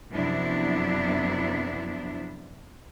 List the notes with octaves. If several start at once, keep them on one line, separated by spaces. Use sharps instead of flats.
F#2 C3 F3 B3 D4 E4